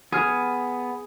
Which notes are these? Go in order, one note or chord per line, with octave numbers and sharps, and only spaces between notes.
B3 G#4 F6